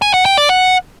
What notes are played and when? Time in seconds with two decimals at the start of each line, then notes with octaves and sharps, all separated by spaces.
0.02 G#5
0.14 F#5
0.25 G5
0.37 D5
0.49 F#5